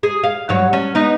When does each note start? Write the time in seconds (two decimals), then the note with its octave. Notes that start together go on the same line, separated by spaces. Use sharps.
0.03 G#4
0.24 F5
0.49 G2 F#3 C#5
0.73 C#4
0.95 B3 D#4